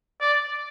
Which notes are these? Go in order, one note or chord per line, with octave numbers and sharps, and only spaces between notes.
D5